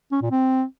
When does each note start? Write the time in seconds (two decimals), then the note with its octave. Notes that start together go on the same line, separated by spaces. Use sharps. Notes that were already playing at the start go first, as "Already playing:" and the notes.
0.12 C#4
0.22 A#2
0.31 C4